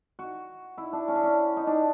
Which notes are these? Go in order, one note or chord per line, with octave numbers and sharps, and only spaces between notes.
F#4
E4
D4
C#4
D4
C#4
D#4
D4